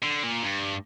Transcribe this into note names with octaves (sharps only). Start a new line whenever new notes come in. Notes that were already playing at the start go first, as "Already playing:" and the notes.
D3
A#2
G2